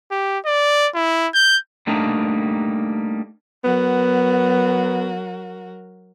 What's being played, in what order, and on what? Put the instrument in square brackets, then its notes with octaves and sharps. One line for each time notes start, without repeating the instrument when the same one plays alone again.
[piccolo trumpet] G4
D5
E4
G6
[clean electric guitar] G3 A3 A#3 D4 D#4
[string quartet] F#3 F#4 A#4 [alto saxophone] B3